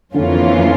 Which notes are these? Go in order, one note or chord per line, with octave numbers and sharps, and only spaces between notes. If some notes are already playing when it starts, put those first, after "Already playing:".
F2 D3 E3 A#3 C#4 F4
F3